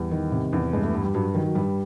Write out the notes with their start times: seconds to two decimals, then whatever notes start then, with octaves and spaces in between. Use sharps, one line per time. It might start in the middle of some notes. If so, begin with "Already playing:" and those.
Already playing: E2 G3
0.11 D#3
0.32 C3
0.53 E2
0.73 G2 G#3
0.83 A3
0.94 G2
1.04 G3
1.14 G2 F#3
1.34 D#3 F#3
1.45 F#3
1.55 G2 G3